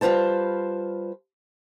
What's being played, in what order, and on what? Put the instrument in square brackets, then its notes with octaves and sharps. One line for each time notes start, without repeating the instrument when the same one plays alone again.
[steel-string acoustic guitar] G3 F4 B4 C5 A5